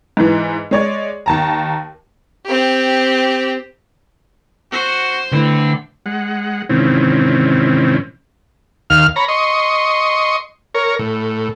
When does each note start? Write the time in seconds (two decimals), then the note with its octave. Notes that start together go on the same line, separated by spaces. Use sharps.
0.17 G#2 E3
0.71 G#3 C#5 D5
1.26 D#2 A5 A#5
2.47 C4 G4
4.72 F#4 C5
5.32 D3 A3 C4 E4 B4
6.06 G#3 F#5
6.70 G#2 C3 D#3 E3 C4 C#4
8.90 D#2 F5 F6
9.16 C#5 A#5 B5
9.28 D#5 C6 C#6
10.74 A#4 C#5
10.99 A2